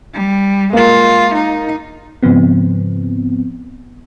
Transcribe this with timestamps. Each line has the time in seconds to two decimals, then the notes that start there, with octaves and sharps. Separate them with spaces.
0.14 G3
0.73 G#3 A#3 F4
1.35 D#4
2.23 G#2 C#3 F3 B3 C4